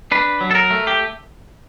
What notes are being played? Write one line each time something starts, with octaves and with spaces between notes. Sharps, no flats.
D4 B4
F#3
A4
A#4
A3
G4